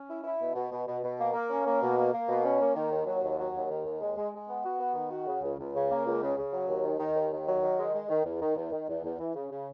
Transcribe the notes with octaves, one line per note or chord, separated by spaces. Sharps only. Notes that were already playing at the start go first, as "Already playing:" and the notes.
Already playing: C#4
E4
E4
B2
B2
B2
B2
B2
A#3
A#3
C#4
A#3
B2
A#3
A#3
B2
C#4
A#3
D#3
D#2
F#3
D#2
F#3
D#2
D#3
D#2
G#3
G#3
G#3
B3
F#4
B3
D#3
F#4
C#3
C#2
C#2
C#3
A#3
C#2
C#3
C#3
F#3
D#2
D#3
D#3
D#2
D#3
F#3
D#3
G#3
G#3
D#3
E2
D#3
E2
D#3
E2
E2
E3
C#3
C#3